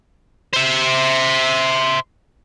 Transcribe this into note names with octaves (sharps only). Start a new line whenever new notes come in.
C5 E5